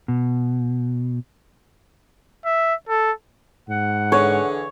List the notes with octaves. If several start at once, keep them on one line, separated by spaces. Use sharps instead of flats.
B2
E5
A4
G#2 F#5
D3 E3 G#4 C#5